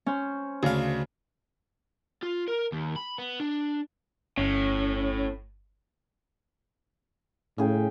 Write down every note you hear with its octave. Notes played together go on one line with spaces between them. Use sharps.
C#4 C5
D2 C#3 F5
F4
A#4
D#2
B5
B3
D4
G1 A2 C#4
A2 C#3 G#4 G5